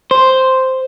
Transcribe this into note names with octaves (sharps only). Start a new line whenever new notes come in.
C5